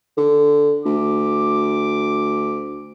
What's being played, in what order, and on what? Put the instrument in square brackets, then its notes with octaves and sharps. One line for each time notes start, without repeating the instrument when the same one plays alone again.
[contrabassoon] D3
[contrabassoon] D2 [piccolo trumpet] D6